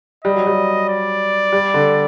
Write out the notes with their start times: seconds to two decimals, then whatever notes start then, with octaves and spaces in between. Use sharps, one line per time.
0.24 G3 D#5
0.36 F#3
0.47 G3
0.89 D5
1.52 G3
1.74 D3